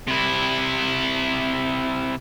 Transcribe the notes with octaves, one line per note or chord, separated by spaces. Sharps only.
C3 E4